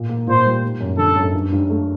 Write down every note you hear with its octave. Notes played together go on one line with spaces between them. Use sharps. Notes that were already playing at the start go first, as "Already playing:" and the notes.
Already playing: A#2
A#3
A#2 C5
G3
G3
F#2
D3 A4
F#2
G2
G2
A3